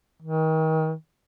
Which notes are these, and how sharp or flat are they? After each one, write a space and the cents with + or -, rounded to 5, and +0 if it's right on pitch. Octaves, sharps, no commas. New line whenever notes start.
D#3 +35